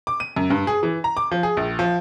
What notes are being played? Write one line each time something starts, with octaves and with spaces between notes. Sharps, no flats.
D6
D#7
F#2
G2
G#4
E3
A#5
D6
F3
G#4
A#1
F3